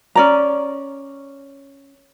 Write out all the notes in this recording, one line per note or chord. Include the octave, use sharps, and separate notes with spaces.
C#4 D5 A#5